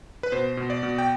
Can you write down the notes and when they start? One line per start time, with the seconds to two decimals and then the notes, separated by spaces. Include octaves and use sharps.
0.23 B4
0.32 B2 C5
0.57 B2
0.70 D5
0.83 B2
0.98 G5